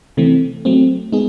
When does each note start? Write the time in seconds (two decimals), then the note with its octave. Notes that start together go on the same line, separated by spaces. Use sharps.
0.17 C3 E3 A3 C4
0.65 F#3 A3 C4
1.12 G#3 B3 D#4 G#4